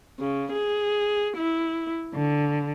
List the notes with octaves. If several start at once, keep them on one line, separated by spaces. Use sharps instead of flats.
C#3
G#4
E4
D3